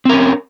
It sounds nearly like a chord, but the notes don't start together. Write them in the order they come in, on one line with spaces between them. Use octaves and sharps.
C4 A#4 C#4